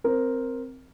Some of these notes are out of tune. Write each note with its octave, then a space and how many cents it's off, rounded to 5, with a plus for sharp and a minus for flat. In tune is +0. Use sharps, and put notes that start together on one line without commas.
C4 +0 A#4 +0